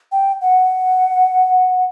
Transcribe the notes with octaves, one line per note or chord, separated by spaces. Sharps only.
G5
F#5